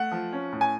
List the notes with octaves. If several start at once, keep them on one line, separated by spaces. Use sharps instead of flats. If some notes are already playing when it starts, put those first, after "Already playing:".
Already playing: A3 F#5
F3
C#4
A2
G#5